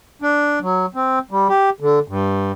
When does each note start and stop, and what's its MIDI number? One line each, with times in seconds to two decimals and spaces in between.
0.22 0.59 62
0.61 0.86 54
0.95 1.19 60
1.31 1.48 55
1.49 1.70 67
1.80 1.99 50
2.08 2.52 43